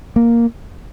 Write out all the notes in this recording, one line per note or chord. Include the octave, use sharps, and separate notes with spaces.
A#3